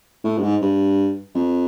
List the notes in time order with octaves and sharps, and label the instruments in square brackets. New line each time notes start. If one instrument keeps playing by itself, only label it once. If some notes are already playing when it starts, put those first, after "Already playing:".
[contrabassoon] A2
G2
G#2
G2
F2